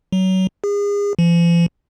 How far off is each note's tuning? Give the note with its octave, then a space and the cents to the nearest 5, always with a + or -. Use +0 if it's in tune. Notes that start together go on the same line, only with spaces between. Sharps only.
F#3 +25
G#4 -35
F3 -45